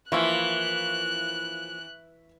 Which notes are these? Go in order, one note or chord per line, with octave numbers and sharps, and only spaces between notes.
E3 F3 A#3 E4 E5 C#6 E6 F#6